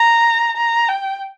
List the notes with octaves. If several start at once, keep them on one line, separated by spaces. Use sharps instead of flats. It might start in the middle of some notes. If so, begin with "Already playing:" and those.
Already playing: A#5
A#5
G5